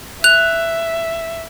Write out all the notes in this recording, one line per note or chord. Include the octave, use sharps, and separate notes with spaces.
E5 F#6 F7